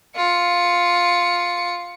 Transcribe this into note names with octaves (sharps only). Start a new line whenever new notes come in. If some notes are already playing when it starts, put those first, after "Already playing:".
F4 C#7